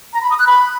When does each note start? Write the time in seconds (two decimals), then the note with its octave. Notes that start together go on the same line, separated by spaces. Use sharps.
0.13 A#5
0.21 B5
0.30 D#6
0.39 F#6
0.47 B5